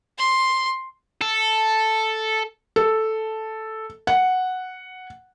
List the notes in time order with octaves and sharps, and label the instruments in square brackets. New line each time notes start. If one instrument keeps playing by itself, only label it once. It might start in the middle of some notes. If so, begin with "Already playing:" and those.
[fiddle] C6
[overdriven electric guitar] A4
[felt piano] A4
F#5